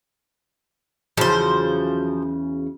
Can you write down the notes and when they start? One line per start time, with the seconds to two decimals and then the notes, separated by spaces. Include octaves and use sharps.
1.17 E2 C#3 F3 F#3 C5